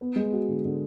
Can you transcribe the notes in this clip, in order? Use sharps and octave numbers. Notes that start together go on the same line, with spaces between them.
B3
G#3
F#4
D3
D3